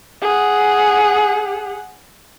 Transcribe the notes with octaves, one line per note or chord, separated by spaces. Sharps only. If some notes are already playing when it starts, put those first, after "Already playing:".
G#4 F#5